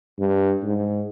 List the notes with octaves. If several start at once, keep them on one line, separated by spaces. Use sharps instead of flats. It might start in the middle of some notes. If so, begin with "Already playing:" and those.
G2
G#2